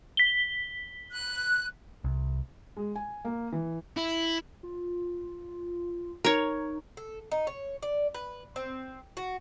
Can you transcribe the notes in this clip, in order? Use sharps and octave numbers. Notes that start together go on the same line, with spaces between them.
B6 G7
F#6
C2
G#3
G#5
A#3
E3
E4
F4
D#4 A#4 C#5
A4
D#4
C#5
D5
B4
C4
F#4